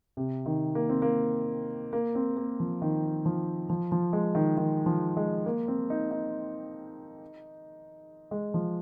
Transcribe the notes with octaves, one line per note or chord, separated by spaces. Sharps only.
C3
D#3
A#3
C4
A#3
A#3
C4
A#3
F3
D#3
F3
F3
F3
G#3
D#3
D#3
F3
G#3
A#3
C4
D#4
D#4
G#3
F3